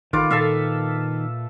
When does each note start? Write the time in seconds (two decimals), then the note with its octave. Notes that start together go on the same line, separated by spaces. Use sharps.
0.13 A1 D#3 F4 B4 D6
0.31 A#2 A4 E5 F5